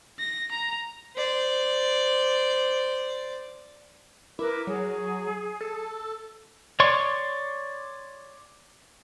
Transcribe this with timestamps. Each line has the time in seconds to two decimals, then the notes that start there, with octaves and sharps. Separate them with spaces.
0.19 A#6
0.52 A#5
1.16 C5 D5
4.39 E4 A#4 B4 D6
4.67 F#3 G#4
5.61 A4
6.80 C#5 D5 C6 C#6